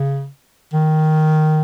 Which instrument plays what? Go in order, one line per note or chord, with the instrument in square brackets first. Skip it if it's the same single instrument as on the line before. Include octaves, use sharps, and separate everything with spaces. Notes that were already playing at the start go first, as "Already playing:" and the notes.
Already playing: [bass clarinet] C#3
D#3